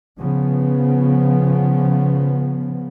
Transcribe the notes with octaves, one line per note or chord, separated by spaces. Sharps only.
C#3 F3 B3